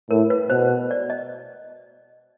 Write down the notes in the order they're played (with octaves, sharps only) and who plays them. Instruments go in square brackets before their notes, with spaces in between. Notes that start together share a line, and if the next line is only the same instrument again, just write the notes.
[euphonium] A2 [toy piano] A#4
[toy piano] B4
[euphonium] B2 [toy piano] C5
[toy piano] D5
D#5